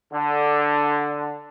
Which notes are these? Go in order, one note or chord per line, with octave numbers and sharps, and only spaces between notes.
D3